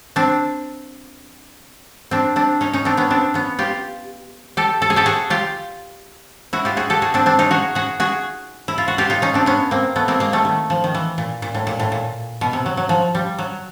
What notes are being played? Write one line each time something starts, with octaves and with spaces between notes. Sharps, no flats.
C4 D4
C4 D4
C4 D4
C#4 D#4
C#4 D#4
C4 D4
B3 C#4
C4 D4
B3 C#4
F4 G4
G4 A4
A4
G#4
G4 A4
F#4 G#4
F4 G4
E4 F#4
F4 G4
F#4 G#4
G4 A4
F#4 G#4
C4 D4
C4 D4
C#4 D#4
F#4 G#4
F#4 G#4
F#4 G#4
E4
F4
F#4
F4 G4
D#4 F4
C#4 D#4
C4 D4
B3 C#4
A#3 C4
A3 B3
A#3 C4
G#3 A#3
G3 A3
D#3
F3
D#3
E3
A#2
A#2
A2
A#2
A2
A#2
B2
C3
F#3
F#3
F3
G3
F#3